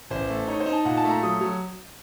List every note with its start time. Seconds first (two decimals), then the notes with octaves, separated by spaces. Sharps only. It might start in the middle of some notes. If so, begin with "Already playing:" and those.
0.11 A1 C5
0.30 A3
0.48 D#4 C#5
0.60 C5
0.66 D#4
0.73 A5
0.85 A#2 F#5
0.97 A5
1.04 A3
1.10 A#5
1.22 F#3 D#6
1.41 F#3